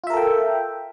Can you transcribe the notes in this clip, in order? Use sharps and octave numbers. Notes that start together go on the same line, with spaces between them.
F4 A4 A#4 E5 G5